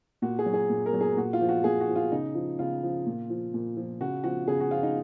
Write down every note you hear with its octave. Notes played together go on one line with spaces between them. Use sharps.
A#2 F#4
G#4
F#3
G#4
A#2
A#4
F#3
G#4
A#2 F#4
F4
F3
F#4
A#2 G#4
F#4
F3
F4
C#3 D#4
F3
C#3 F4
F3
A#2
F3
A#2
F3
C#3 F#4
F3 F#4
C#3 G#4
F#4
F3 F4
D#4